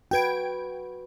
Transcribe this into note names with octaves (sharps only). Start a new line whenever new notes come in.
F#4 B4 G5 G#6 D7